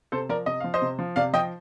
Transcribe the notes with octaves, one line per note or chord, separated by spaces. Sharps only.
C3 A4 C5
F3 A#4 D5
C3 D#5
F3 F5
C5 D#5
C3
F3
C3 D5 F5
F3 D#5 G5